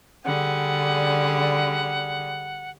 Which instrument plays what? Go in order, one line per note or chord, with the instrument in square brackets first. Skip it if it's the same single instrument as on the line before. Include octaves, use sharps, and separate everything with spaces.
[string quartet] D3 G3 G#4 [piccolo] F#5